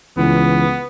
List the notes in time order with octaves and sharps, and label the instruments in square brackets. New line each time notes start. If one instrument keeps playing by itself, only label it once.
[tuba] C#2 [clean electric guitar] E3 [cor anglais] B3